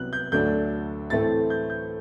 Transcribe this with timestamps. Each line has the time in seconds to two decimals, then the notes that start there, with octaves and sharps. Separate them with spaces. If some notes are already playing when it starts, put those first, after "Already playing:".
Already playing: C2 C3 F#3 B3 F#6
0.13 G6
0.32 D2 D3 F#3 A3 D4 G6
1.10 A2 E3 A3 C4 A6
1.50 G6
1.70 G6